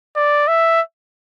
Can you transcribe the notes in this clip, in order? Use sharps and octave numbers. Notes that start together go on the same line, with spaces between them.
D5
E5